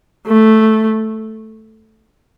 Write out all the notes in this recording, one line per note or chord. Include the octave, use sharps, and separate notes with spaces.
A3